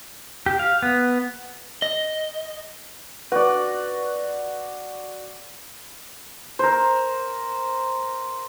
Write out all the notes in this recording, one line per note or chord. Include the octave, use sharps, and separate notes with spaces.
G4
F5
B3
D#5
F#4 B4 D5
A#4 C5